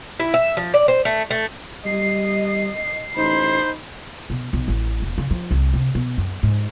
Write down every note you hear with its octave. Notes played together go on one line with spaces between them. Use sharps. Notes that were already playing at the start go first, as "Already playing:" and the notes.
E4
E5
F3
D5
C5
A3
A3
G3 D#5 C7
A1 D#4 C5 B5
B2
B1
A1
E1
C#3
F3
C2
C3
B2
F#2
G#2